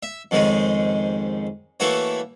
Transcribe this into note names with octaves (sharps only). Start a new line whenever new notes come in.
E5
F2 G#2 D#3 G#3 C#4
E3 A3 A#3 E4 F#4 C#5